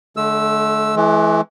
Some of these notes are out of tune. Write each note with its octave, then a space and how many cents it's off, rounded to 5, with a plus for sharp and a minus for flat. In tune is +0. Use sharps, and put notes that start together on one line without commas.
D3 +0 A3 -40 E6 +0
E3 +0 G#3 +45